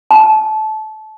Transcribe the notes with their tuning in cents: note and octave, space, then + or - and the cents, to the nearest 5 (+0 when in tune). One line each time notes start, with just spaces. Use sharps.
A5 -20